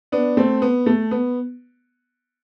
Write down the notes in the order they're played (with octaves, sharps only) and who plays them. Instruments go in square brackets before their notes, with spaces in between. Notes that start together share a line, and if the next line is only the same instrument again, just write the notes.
[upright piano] B3 D4
A3 C4
B3
A3
B3